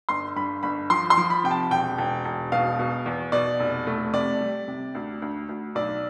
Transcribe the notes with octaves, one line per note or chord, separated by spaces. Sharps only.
G1 C6
G2 B5
G1 B5
F3 C6
C6
F3
B5
C3 G5
A5
E1 G5
E1
E1
B2 F5
B2
E2
B2 D5
F1
A3
C3 D5
G3
C3
D2
D2
D2
B1 D5